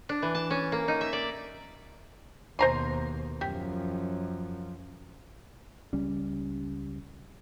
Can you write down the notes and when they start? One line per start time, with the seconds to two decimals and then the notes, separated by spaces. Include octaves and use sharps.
0.09 D4
0.22 E3
0.35 A5
0.50 C#4
0.72 A#3
0.88 D#4
1.01 E5
1.13 D5
2.59 D#2 B2 C5 A#5 C6
3.41 F#2 F3 G4
5.93 C#2 G3 C#4